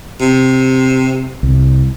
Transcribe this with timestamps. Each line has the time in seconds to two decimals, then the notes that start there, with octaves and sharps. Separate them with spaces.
0.20 C3
1.43 C2